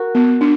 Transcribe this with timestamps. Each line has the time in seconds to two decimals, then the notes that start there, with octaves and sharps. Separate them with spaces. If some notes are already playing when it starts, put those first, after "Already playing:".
Already playing: F#4 A#4
0.15 B3
0.41 D4